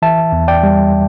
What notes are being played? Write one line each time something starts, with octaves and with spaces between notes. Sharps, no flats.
E3 E5 A5
E2
D5 G5
G3